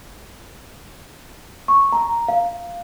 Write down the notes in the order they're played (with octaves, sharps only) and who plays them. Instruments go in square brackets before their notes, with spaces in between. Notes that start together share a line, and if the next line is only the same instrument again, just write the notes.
[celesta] C#6
A#5
F5